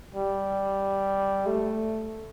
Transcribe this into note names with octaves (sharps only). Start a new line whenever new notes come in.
G3
A3